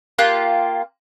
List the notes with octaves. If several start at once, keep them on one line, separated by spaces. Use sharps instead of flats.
A#3 F4 G4 F#6